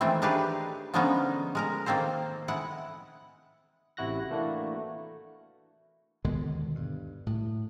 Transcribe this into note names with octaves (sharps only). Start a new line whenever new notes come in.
D#3 E3 G#3 A3 C4
D4 D#4 G4 G#4 B4 F5
D3 F3 G#3 B3 C#4 D#4
G#3 A#4 A#5
D#3 A#3 C4 A4 C5
G#3 E4 F#5
A1 C3 E4 F#4 F#6 A#6
E3 A3 A#3 D4 E4 F#4
D#2 B2 D3 G#3
G2
A2